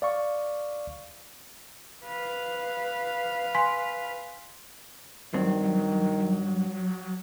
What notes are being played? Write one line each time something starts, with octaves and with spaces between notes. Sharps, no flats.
D5 F5 C#6
B4 F5
G#5 C6 B6
G2 D#3 F#3 C4